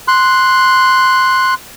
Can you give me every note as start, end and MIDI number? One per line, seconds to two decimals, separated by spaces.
0.08 1.54 84
0.08 1.54 90